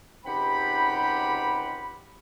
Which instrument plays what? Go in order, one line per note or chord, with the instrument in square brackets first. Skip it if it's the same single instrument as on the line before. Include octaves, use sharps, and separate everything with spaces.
[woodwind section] C#2 C4 D#4 G4 F#5 B5